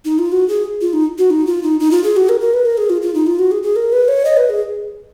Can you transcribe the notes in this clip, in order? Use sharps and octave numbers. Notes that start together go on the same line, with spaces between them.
D#4
F4
F#4
G#4
F4
D#4
F#4
D#4
F4
D#4
D#4
F4
G#4
F#4
A#4
A#4
B4
A#4
G#4
F4
F4
D#4
F4
F#4
G#4
G#4
A#4
B4
C#5
D#5
B4
G#4